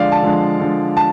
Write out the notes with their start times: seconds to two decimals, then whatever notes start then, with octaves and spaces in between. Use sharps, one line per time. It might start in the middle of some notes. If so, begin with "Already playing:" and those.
Already playing: D3 F3 G#3 D5 F5
0.12 A5
0.23 D3 F3 G#3
0.60 D3 F3 G#3
0.97 A5